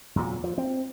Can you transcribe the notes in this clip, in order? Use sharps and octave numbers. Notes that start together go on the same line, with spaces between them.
E2 A#2 F#3
F3
C4